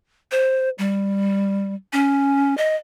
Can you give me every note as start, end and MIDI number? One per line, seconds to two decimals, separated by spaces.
0.31 0.69 72
0.78 1.75 55
1.93 2.56 61
2.58 2.75 75